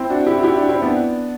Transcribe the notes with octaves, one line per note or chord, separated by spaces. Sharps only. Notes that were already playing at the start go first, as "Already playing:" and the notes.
Already playing: C4 E4
D4 F#4
E4 G4
F#4
E4 G4
D4 F#4
C4 E4
B3 D4